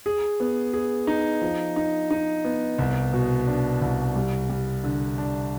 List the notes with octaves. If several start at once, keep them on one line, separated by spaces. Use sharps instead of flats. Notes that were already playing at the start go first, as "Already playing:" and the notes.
G#4
B3
G#4
D#4
F3
D#4
D#4
B3
C2
B2
D4
C2
G3
G3
D3
D4